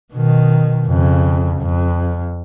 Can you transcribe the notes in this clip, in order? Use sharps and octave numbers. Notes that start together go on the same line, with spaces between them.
B2 D#3
F2 C#3
F2